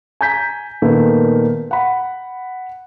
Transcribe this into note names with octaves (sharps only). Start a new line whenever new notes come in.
G#5 A#5 G6 B6
A#2 D#3 A3 B3
F#5 B5